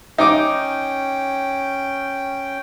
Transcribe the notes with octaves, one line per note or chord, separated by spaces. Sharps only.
C#4 D#4 G5 D6